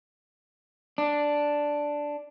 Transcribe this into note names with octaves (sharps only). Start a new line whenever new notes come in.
D4